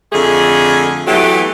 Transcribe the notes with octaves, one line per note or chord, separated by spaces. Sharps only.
F2 D3 A3 G#4
E3 F#3 A3 B3 G4